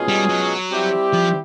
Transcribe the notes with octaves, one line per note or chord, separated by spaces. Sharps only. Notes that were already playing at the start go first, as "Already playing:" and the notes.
Already playing: B2 G#3 C#4 F4 G#4
G3
F#3
G3 C4 E4 G4
F3